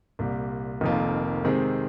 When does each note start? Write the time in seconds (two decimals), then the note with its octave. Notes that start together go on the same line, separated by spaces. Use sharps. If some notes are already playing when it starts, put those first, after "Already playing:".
0.19 C2 A#2 G3
0.81 F1 F2 D#3 A#3 F4
1.45 C3 D#3 G#3 C4